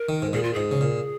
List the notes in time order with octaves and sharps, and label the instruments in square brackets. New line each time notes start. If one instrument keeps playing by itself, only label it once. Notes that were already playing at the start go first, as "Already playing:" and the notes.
Already playing: [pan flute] A#4
[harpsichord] D#3
G#2
[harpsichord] A#2 [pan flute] G#4
[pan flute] F4
[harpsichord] G#2 [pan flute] G#4
[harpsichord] C#3
A#2